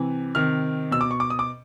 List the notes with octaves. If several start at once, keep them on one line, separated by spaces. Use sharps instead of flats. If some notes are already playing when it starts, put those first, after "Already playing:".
Already playing: C3 E3
C3 D#3 F6
B2 E6
D6
C#6
D6
D#6
D6